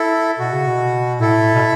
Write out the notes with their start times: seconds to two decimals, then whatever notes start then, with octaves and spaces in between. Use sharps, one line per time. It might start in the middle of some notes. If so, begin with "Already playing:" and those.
Already playing: E4 A4
0.39 B2 F#4
0.53 C#3
0.67 B2
1.20 A2 E4 A4
1.55 B2